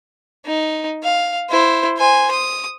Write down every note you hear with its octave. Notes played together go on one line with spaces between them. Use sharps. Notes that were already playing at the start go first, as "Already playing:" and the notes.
D#4
F5
E4 C5
C5 G#5
D#6